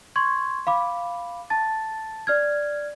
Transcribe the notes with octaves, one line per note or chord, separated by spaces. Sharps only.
C6 C#6 G#6
F5 B5 D6
A5 A6
D5 F6 G#6